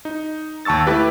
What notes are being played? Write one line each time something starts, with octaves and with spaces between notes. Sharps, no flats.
D#4
D#2 A5 C#6 E6 A6
A3 E4 G4 B4